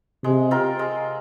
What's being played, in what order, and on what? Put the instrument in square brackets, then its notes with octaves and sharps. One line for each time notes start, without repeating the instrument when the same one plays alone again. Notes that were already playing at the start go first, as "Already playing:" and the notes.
[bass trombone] C3 [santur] G#3
[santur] C4 F4 A#4
G#3